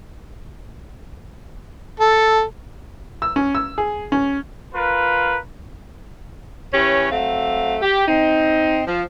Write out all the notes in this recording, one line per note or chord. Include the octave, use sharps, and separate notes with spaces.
A4
E6
C#4
E6
G#4
C#4
F4 A#4 B4
E3 C#4 G4 C#5
F#3 A3 C4 F5
G4
C4 D#4
F3